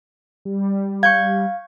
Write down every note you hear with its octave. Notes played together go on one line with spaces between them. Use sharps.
G3
F5 C#6 G6 G#6